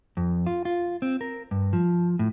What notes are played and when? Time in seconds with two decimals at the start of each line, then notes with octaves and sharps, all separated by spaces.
0.17 F2
0.47 F4
0.65 F4
1.02 C4
1.21 A#4
1.51 G2
1.73 F3
2.19 A2